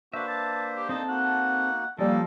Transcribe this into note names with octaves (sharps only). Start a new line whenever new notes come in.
A#3 D4 F#4 B4 C5 E5
A5
G4
C4 D#4 A4 A5
A#3 D#4 F#4 F#5
F3 G3 A#3 C#4 D#4 A4 D#5